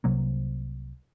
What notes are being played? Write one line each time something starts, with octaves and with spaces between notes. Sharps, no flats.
C2 C3 F#3 A#3